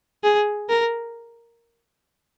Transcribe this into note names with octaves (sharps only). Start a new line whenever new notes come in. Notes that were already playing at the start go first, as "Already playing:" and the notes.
G#4
A#4